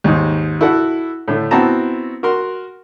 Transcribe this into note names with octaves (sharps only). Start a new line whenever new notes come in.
D#2 G#2
E4 F#4 A4 F#5
A2 D3 A3
B3 C4 E4 F#4 A5 A#5
F#4 A#4 C6